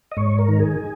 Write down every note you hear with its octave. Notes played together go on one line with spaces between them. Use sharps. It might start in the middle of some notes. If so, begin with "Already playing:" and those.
D#5
G#2 C#5
A#4
D#3
G#4